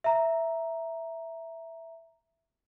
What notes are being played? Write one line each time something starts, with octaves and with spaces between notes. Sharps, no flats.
E5 A#5